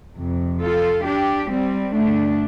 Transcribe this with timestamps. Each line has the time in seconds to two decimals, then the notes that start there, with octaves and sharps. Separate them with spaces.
0.16 F2 C3
0.60 F4 A4
1.05 D4 G4
1.50 G3 C4
1.94 G2 D3 A3 D4